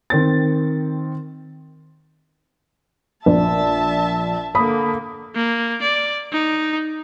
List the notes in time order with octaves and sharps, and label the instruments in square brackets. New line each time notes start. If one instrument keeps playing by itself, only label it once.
[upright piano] D#3 C4 A6
[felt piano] A#1 [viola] E5 A5
[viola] D3 A#3 [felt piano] B5 D#6
[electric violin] A#3
D5
D#4